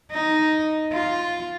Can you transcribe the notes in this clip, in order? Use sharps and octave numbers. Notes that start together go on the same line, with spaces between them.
D#4
F4